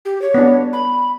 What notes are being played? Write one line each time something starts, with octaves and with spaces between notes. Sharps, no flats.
G4
C#5
B3 D4
B5